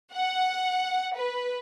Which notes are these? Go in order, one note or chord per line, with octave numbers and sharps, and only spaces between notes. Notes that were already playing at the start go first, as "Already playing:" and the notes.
F#5
B4